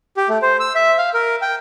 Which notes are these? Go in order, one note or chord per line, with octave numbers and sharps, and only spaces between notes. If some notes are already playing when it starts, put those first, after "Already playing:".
G4
A3
C5
E6
E5
F5
A#4
G5